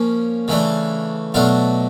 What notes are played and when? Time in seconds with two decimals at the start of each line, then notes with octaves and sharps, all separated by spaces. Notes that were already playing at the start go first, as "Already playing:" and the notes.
Already playing: F3 A#3 C#4
0.48 C#3 E3 A3 D4
1.34 B2 F#3 A3 D4 F4